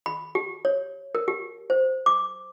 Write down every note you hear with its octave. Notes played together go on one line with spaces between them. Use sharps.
B5
G4
C#5
A#4
G4
C5
D6